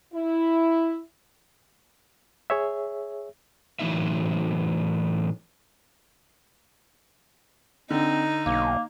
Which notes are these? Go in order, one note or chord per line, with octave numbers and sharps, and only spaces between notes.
E4
G#4 C#5 E5
A2 E3 F#3 C4 D#4 E5
D3 C4 D#4
B1 A#3